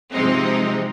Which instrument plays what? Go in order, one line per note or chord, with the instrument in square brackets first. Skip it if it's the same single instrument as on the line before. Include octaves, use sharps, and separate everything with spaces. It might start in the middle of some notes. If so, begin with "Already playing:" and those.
[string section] C3 F3 G#3 C4 D#4